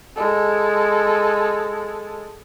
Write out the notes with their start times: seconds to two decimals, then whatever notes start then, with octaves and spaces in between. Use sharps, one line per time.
0.16 G#3 A4